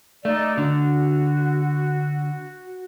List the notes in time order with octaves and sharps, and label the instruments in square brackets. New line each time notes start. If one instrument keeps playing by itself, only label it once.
[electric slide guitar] A3 [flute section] D#4 D5
[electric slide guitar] D3 [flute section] F#4